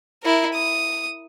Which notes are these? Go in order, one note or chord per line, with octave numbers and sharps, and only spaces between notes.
E4 A#4
D#6